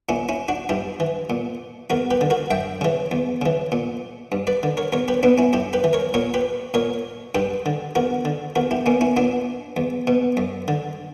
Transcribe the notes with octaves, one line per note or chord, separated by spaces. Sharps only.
A#2 C#4 E4
C#4 E4
D4 F#4
G2 E4 G4
E3
A#2
E2 F#4 A#4
G4 B4
D3
F#4 A#4
F#2 E5 G5
C#3 E3
E2
C#3 E3
A#2
G2
B4 D5
D3
A#4 C#5
E2 A#4 C#5
G4 B4
B2 B3 D4
C#4 E4
F#2 E4 G4
G4 B4
E3
A#4 C#5
A#2 A#4 C#5
G4 B4
A#2 A#4 C#5
G2 G4 B4
D3
E2 F#4 A#4
D3
E2 F#4 A#4
E4 G4
B2 A#3 C#4
C#4 E4
A#2 B3 D4
E2
B2
F#2
D3